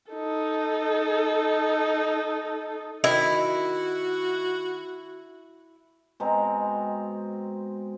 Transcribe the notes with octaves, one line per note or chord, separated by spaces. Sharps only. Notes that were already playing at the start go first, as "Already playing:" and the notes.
D#4 A4
D#3 E4 F#4 D#5
B2 G#3 C4 A#5